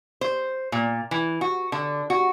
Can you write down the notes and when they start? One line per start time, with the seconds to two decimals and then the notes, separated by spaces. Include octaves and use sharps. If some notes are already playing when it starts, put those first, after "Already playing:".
0.21 C5
0.72 A#2
1.11 E3
1.41 F#4
1.72 D3
2.10 F#4